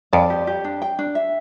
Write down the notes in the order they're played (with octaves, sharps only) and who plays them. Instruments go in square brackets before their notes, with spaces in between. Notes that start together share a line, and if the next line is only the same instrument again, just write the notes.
[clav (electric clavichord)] F2 [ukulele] D5
[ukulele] G4
G4
D4
G5
D4
E5